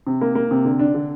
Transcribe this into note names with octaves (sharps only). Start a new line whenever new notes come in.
C3
A#3
A#3
C3
D3
D4
D3